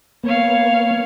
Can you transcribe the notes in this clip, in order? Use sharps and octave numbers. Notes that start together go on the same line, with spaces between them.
A#3 B3 C#5 F5